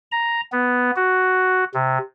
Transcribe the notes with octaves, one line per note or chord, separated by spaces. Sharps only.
A#5
B3
F#4
C3